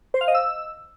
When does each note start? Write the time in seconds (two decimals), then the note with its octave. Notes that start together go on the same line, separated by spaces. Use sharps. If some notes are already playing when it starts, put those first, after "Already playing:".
0.14 C5
0.21 F5
0.28 D#5
0.35 E6